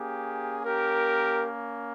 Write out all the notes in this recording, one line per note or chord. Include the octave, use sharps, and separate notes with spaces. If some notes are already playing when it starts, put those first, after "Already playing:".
Already playing: A#3 C#4 G4 G#4
G4 A#4